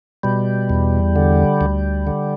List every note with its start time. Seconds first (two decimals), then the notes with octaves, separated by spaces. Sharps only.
0.23 B2 G3
0.70 E2
1.16 D3
1.61 D2
2.07 D3